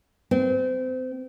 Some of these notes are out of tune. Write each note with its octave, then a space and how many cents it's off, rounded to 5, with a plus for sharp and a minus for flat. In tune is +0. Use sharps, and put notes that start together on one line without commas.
C4 -30